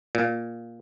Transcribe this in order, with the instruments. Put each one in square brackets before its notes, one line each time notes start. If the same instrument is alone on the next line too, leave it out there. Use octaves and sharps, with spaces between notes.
[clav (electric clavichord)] A#2